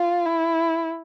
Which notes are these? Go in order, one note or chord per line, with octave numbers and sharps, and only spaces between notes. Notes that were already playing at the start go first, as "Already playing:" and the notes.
Already playing: F4
E4